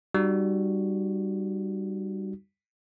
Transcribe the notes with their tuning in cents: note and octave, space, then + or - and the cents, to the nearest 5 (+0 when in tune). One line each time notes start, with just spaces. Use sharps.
G3 +0 D#4 -40 F#4 +0